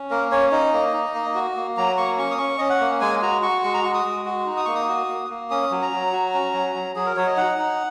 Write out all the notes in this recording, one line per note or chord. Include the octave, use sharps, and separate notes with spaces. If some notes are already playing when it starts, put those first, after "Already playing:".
Already playing: C#4
A#3 A#4
C#4 C#5
D#4 D#5
A#3
D#4
A#3
F#4
A#3
F#3 A#5
A#3 C#6
C#4 C#6
D#6
C#4 C#6
C#4 D#5
F#5
A#3
G#3 G#5
F#4 A#5
F#4 C#6
G#3 C#6
A#5
F#4 C#6
D#6
G#3
F#4
D#4
D#6
A#3 C#6
D#6
F#4
A#3
A#3
C#4 D#6
F#3
A#5
F#3
F#4
C#4
F#3
F#3
F#3 G#4
A#4
F#3 C#5
D#5
D#4 F#5
D#4